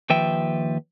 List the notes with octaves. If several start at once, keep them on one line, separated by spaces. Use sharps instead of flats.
D#2 F3 B4 E5 G5